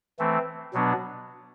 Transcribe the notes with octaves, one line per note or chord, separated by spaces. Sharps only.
E3 A3 C4
B2 F#3 B3 D4